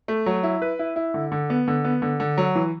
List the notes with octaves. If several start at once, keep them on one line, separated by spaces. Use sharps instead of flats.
A3
F#3
E4
B4
E4
E4
D3
D3
B3
D3
B3
D3
D3
F#3
E3